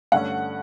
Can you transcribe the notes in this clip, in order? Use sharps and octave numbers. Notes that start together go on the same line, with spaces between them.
G2 D3 A3 C#4 F#5